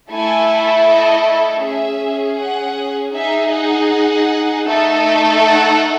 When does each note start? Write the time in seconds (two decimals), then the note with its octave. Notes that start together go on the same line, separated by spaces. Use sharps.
0.11 A3 E4 A4 G#5
0.87 D#5
1.62 C#4 G#4 E5
2.39 F#5
3.14 D#4 G#4 E5
3.53 F#5
4.67 A3 D#4 A4
5.43 F#5